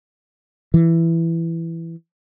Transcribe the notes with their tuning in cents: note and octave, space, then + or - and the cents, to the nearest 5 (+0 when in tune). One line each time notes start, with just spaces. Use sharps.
E3 +10